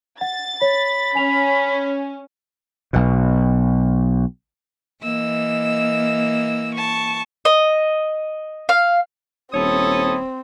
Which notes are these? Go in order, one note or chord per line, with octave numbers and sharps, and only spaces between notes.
F#5 A6
C#5 B5
C#4 G#5 F7
B1 B2
E3 A#3 D#5 E6
A5 C#6
D#5
F5
D#1 C4 E4 A4 C#5 D#6